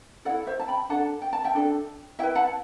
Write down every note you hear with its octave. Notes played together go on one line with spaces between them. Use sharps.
E4 A4 D5 F#5
C5 E5
A5
G5 B5
D4 A4 F#5 A5
G5
A5
E5 G5
D4 A4
E4 B4 E5 G5
F#5 A5